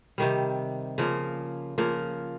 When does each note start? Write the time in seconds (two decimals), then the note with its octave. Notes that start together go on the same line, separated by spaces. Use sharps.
0.18 C3 D#3 G3
0.98 C#3 F3 A#3
1.78 C#3 F3 A#3